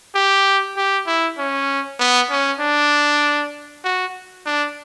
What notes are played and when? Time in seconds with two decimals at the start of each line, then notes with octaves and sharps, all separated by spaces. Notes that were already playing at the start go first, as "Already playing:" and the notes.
0.15 G4
0.77 G4
1.07 E4
1.38 C#4
2.00 B3
2.31 C#4
2.60 D4
3.84 F#4
4.46 D4